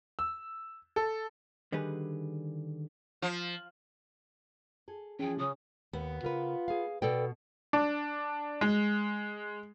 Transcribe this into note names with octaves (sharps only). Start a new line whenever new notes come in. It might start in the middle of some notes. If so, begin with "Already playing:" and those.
E6
A4
D3 D#3 G3 G4 G#4 B4
F3
G#4 A4
E3 F3 C#4 G#4 G5
C#3 D#6
D#2 B3
C#3 F4 A#4 B4
G#4 F5
B2 A4 B4 D5 G5
D4
G#3